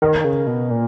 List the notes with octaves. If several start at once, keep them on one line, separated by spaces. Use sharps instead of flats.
D#3 A#4
C#3
B2
A#2